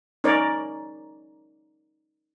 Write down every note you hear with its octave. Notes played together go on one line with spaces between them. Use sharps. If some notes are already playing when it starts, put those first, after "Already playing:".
C#4 D#4 A#4 C#5 D5